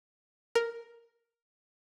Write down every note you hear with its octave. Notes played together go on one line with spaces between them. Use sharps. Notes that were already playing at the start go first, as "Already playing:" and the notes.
A#4